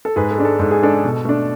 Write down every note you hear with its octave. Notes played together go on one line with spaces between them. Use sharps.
A4
G#2 G#4 B4
A4
G#3 D4
A4
G#2 A4
G#4
G#3 D4 A4
B2
A3 D4